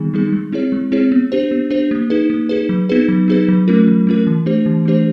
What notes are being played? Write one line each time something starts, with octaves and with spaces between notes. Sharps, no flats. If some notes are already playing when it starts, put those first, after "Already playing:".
Already playing: D#3 G3 B3 D#4 G#4
G3 B3 D#4 G#4
G#3
C4 E4 G#4 C#5
G#3
C4 E4 G#4 C#5
B3
D4 G4 C5
B3
D4 G4 C5
A#3
D#4 G#4 B4
A#3
D#4 G#4 B4
F#3
B3 D#4 G#4 B4
F#3
B3 D#4 G#4 B4
F#3
A3 C#4 F4 A#4
F#3
A3 C#4 F4 A#4
E3
A3 D4 G4 C5
E3
A3 D4 G4 C5